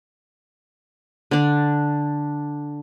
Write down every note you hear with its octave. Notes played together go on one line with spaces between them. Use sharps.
D3 D4